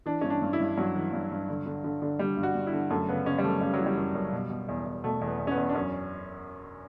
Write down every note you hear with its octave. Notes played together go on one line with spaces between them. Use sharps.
E3 D4
G2 C#4
D4
G2
E4
G2
G2 F#3
E3
G2
G2
D3
D3
D3
D3
D3 G3
G2
F#4
G2
E4
D3
F#2 A3
C#3 B3
C#3 C#4
G3
F#2 A3
C#3 G3
F#3
E3
G3
F#2
F#2
B2
B2
E2
E2
B2 A3
E2
B3
E2
C#4
B3
E2
D4
F#2 C#4